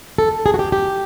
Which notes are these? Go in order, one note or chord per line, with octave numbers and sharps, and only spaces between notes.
A4
G#4
F#4
G4
G4